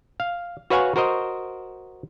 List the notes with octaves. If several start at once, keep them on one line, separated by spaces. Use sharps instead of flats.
F5
F#4 B4 C#5 F5 F#5 G#5
F#4 A#4 C5 D#5